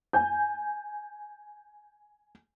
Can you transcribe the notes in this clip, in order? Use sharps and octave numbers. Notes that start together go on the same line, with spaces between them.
G#5 G6